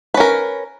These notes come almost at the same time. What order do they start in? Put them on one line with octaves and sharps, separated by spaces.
B4 C#4 A#4